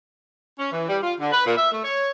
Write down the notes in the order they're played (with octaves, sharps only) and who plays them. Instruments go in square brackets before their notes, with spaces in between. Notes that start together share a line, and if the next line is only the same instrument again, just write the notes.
[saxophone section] C#4
E3
G3
F4
D3
B4
A#2
E5
A3
C#5